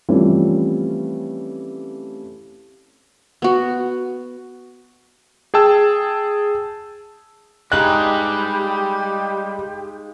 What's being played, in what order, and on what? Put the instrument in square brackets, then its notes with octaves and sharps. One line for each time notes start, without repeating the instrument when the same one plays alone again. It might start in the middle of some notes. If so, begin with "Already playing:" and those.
[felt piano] E3 F3 G3 A3 C4 C#4
[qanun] B3 F#4
[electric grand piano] G#4 G5 A5 E6
[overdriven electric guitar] G3 B4 [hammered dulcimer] G#3 D#4 F5 [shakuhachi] G4 [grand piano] F#6